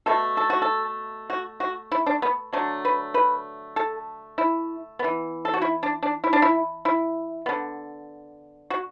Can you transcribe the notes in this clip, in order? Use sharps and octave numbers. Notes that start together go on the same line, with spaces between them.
B2 A3 A4
A4
F#4
A4
F#4
F#4
E4
D4
B3
D3 F#3 A3
B4
B4
A4
E4
E3 B3
A4
F#4
E4
D4
D4
E4
D4
E4
E4
D3 B3
F#4